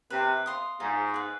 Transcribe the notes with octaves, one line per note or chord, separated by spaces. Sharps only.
C3 B4
F5 C6 D#6
G#2 F4
G#4 B4